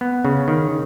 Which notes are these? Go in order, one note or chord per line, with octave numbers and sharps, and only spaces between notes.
B3
C#3
D#3